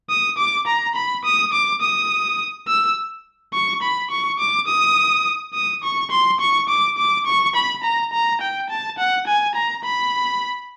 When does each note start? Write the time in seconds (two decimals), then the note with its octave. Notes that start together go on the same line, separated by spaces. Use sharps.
0.10 D#6
0.38 D6
0.67 A#5
0.96 B5
1.25 D#6
1.53 D6
1.82 D#6
2.68 E6
3.54 C#6
3.82 B5
4.11 C#6
4.39 D6
4.68 D#6
5.54 D#6
5.84 C#6
6.11 C6
6.40 C#6
6.69 D6
6.98 D6
7.27 C#6
7.55 B5
7.83 A#5
8.13 A#5
8.41 G5
8.70 A5
8.99 F#5
9.27 G#5
9.55 A#5
9.84 B5